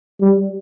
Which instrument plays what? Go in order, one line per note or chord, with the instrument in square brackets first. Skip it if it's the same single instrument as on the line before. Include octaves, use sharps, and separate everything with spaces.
[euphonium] G3